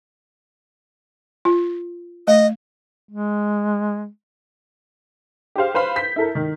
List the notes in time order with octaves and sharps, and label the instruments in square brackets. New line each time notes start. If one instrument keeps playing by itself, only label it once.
[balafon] F4
[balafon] A3 [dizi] D#5
[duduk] G#3
[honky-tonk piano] G4 G#4 C5 F5
B4 C5 F5 B5 C6
G6 B6
E4 A4 A#4
D#3